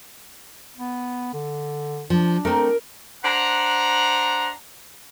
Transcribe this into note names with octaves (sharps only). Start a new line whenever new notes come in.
B3
D3
F3 D4
A3 C4 A#4
D4 C5 F#5 A#5